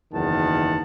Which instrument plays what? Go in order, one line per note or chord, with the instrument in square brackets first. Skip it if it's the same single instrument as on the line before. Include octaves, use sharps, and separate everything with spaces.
[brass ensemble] F#1 E2 D#3 F#5 A5